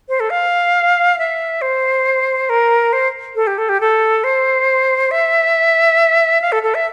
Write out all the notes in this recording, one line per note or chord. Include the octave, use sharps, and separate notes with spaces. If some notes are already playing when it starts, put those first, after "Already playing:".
C5
A4
F5
E5
C5
A#4
C5
A4
G4
A4
G4
A4
C5
E5
F5
A4
A4
E5